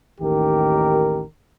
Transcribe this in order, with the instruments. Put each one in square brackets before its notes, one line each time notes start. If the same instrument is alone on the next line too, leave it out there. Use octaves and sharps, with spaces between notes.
[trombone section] A1 D#2 D#3 G4 A#4